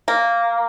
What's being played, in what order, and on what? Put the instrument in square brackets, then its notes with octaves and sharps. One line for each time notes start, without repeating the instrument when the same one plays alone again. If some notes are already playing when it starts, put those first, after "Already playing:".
[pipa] A#3